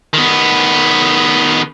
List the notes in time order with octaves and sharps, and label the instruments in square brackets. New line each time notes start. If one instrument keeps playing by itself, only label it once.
[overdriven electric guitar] D#3 B3